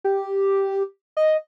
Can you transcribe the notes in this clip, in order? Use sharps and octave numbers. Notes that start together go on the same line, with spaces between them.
G4
D#5